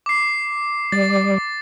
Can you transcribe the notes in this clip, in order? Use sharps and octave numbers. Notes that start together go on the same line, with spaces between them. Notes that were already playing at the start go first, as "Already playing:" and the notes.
D6 C7
G3 D5 A6